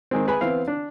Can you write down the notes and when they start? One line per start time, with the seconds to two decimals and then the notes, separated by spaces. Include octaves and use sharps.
0.11 D#3 G#3 C4
0.27 G#4 B4 G#5 B5
0.41 E3 B3 C4 F5
0.68 D4